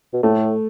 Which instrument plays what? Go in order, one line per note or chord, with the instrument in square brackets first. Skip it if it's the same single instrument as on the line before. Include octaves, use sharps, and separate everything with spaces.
[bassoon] B2
[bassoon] A2 [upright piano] A3